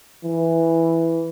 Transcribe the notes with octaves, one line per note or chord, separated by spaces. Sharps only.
E3